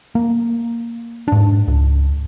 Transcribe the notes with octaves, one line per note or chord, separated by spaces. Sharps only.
A#3
G#2 D4
C#2